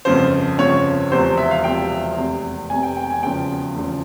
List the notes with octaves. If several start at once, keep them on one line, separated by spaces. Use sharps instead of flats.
G1 F2 C#3 F3 C5
G1 F2 C#3 F3 C#5
E1 E2 C3 F3 C5
E5
F5
E1 E2 C3 F3 G5
F1 E2 C3
F1 E2 C3 G#5
G5
G5
G#5
E1 E2 C#3 F3 G5
E1 E2 C#3 F3